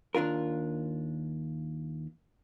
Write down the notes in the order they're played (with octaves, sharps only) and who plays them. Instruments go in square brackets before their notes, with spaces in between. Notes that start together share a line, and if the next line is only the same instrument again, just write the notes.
[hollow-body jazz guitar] D#2 D4 F4 A#4